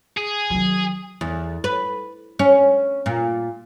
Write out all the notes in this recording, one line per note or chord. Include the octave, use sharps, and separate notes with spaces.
G#4
D#3 F#3
E2
B4
C#4
A#2